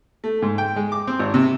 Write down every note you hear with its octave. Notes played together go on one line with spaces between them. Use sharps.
A3
G#2
G5
G#3
D6
C4
G#1
C3